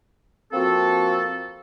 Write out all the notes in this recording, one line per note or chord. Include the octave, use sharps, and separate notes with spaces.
F3 A#3 C4 F#4 A4